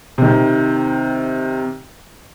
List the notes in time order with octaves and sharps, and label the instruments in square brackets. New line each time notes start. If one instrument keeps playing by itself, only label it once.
[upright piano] C3 D#3